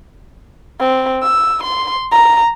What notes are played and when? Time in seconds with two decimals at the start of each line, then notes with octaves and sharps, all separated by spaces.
0.80 C4
1.22 E6
1.63 C6
2.11 A#5